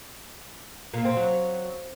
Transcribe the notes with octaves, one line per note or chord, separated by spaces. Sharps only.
A#2
C4
F#3